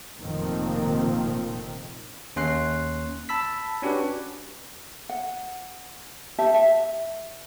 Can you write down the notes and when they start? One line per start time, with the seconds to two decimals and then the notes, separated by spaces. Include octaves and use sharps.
0.19 F1 F2 A#2 D#3 F3 C4
2.36 D#2 C#4 C6 F#6 C7
3.29 A5 B5 E6 B6
3.82 C#4 D4 F#4 G4 B4
5.09 F#5
6.39 G4 E5 A5
6.54 E5